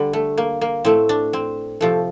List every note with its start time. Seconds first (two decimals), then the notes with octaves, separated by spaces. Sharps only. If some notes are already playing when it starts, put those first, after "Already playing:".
Already playing: D3 G3
0.13 A3
0.38 A#3
0.61 A#3
0.84 A2 A3 C4
1.09 D4
1.33 C4
1.81 C3 F3 A3